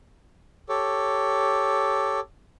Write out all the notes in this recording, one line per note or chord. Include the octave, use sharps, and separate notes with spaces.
G4 A4 C#5